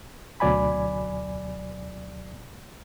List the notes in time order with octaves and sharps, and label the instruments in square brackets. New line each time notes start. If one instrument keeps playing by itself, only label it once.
[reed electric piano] D2 B2 F#3 D5 G#5 B5